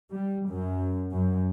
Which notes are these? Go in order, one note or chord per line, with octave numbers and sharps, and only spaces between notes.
G3
F#2
F#2